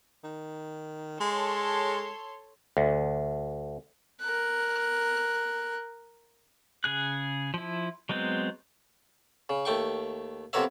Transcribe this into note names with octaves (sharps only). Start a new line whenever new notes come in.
D#3
G#3 A4 C#5 C6
D2
A#4 F#6
C#3 G#4 F#6
F3 E4
F#3 G#3 B3 C4
C#3
D#2 A3 G5 C#6
F2 C3 B3 A#4 C#5 E5